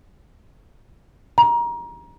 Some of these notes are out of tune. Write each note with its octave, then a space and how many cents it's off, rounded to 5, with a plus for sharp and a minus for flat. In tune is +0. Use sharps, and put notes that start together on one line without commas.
A#5 +25